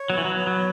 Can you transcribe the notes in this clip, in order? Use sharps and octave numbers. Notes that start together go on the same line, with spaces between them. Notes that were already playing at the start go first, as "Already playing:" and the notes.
Already playing: C#5
F#3 B3
E3
F#3
B3
F#3